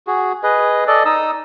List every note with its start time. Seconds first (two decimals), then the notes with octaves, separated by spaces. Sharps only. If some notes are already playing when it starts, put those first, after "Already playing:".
0.07 F#4 G#4
0.43 G#4 B4 D#5
0.87 A4 D5 D#5
1.05 D#4 D#6 E6